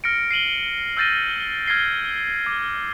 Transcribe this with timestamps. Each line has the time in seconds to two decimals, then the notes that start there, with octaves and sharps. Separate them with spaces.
0.04 F6 A#6 C#7 D7
0.30 C7 D#7 F#7 G7
0.97 E6 F6 G6 A6 A#6 D#7
1.67 F6 G#6 A#6 C7 G7
2.46 D6